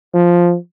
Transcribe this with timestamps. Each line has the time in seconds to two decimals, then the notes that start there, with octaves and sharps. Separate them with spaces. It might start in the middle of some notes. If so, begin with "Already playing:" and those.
0.14 F3